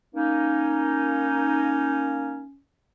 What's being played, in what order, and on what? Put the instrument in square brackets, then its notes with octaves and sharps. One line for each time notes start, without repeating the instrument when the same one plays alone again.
[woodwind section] A#3 D#4 [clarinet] C#4